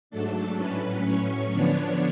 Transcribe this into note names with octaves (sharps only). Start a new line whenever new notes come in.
G#2 F#3 A3 D4 A4
A2 F#3 C#4 B4
A2 F#3 C#4 C#5
D3 F3 B3 D4 C#5